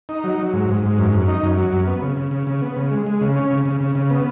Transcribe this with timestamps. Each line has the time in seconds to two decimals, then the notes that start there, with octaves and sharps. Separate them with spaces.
0.09 D#4
0.24 F#3
0.39 F#3
0.53 G#2
0.69 G#2
0.83 G#2
0.98 F#2
1.13 F#2
1.28 D#4
1.43 F#2
1.57 F#3
1.73 F#2
1.87 B3
2.02 C#3
2.16 C#3
2.31 C#3
2.47 C#3
2.62 B3
2.76 C#3
2.91 G#3
3.06 G#3
3.21 C#3
3.36 C#4
3.51 C#3
3.65 C#3
3.81 C#3
3.95 C#3
4.10 B3